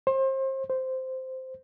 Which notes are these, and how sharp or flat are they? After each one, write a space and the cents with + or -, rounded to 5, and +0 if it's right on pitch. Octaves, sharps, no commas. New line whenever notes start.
C5 +35
C5 -5